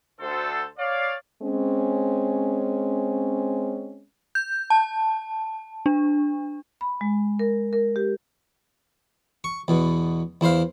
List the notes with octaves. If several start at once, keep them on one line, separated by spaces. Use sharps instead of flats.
D2 A4 C5
C#5 D5 F5
G#3 C4 C#4
G6
A5
D4
B5
G#3
A#4
A#4
G4
C#6
E2 B2
E2 E4 C5 F5